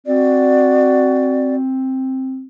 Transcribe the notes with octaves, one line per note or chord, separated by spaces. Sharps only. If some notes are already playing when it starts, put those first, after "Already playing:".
C4 F#4 D5